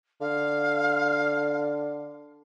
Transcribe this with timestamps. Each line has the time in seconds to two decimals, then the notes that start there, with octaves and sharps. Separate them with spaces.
0.21 D3 F5